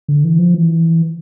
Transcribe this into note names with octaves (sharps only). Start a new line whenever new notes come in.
D3
E3
F3
E3